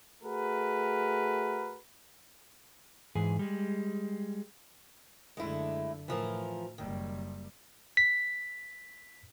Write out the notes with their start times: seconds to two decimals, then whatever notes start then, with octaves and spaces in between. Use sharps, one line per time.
0.23 A3 F#4 G#4 A#4 B4
3.15 G#2 E3 G#4
3.39 G3 G#3
5.37 F#2 D3 G#3 A3 E4
6.08 A2 E3 F3 A#4
6.78 F#1 D#3 G3
7.97 B6